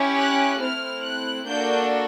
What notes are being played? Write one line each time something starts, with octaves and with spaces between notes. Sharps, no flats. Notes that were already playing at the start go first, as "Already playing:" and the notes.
Already playing: C#4 E4 G4
F#6
A3 C4 E4 F6
F#6
A#3 D4 F#4 A4 G6